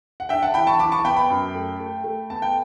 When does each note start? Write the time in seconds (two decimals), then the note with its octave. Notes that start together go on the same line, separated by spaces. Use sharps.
0.20 F#5
0.29 D4 E5 G5
0.42 F#5 A5
0.54 E3 G5 B5
0.67 A5 C#6
0.79 E3 B5 D6
0.92 A5 C#6
1.04 B3 G5 B5
1.17 G5 B5
1.30 F#2
1.55 A3
1.80 A3
2.04 A3
2.30 B3 A5
2.42 G5